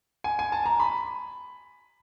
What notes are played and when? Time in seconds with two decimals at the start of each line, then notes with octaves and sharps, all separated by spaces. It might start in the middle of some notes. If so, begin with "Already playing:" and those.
0.24 G#5
0.39 G#5
0.52 A5
0.66 A#5
0.80 B5